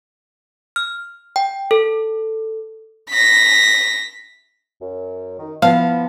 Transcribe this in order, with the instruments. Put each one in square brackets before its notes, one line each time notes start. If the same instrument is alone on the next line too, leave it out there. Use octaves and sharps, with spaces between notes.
[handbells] F6
G5
A4
[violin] A#6 B6
[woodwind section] F#2
D#3
[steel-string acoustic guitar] F3 B3 [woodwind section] E4 A5 [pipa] F5